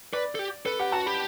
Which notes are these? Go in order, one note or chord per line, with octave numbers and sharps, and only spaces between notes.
B4 D5
A4
G4
A4 B4
G4 F#5
F#4 A5
G4 B5